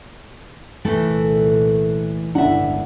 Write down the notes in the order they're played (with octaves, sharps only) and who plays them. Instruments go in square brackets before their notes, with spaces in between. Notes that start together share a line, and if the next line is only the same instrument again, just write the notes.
[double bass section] C2 A#2 [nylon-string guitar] E3 A3 A4
[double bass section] G1 C#2 A2 [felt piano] D4 E4 [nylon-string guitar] E5 F#5